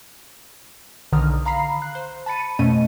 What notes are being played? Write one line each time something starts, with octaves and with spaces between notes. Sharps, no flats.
B1 D3 D#3 A#5 D#6 F6
F5 A#5 B5 C7
F#6
C5
A5 B5 A6 C#7 D#7
F2 B2 A3 C#4 D#5 D#7